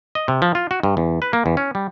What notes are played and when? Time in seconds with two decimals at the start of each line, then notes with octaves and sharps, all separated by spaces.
0.15 D#5
0.28 C3
0.42 F3
0.55 F4
0.71 F#4
0.83 G2
0.97 E2
1.22 B4
1.33 A#3
1.46 E2
1.57 C#4
1.75 G3